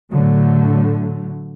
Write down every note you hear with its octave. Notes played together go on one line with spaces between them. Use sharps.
A2 D3 F#3 A3